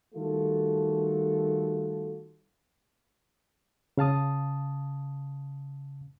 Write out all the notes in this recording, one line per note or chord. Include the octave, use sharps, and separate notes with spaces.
D#3 G3 A3 F4 F#4 A4
C#3 F5 A5 D#6